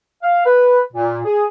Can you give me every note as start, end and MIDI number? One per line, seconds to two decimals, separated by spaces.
0.23 0.45 77
0.45 0.81 71
0.93 1.20 46
1.25 1.44 68